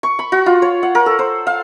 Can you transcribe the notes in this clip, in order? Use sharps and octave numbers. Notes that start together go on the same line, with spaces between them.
C#6
B5
F#4
F4
C#5
F#5
A#4
A4
C5
F5